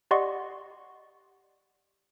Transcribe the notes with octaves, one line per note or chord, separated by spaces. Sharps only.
G4 D5 D#5 F#5 C6 C#6